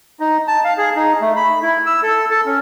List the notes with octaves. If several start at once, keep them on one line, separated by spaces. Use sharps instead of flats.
D#4
A5
F5
G#4
D#4
A3
B5
E4
E6
A4
A4
C#4